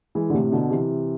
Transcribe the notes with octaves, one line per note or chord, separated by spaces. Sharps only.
E3 G#3
D3
A2 C3
B2 D3
C3 E3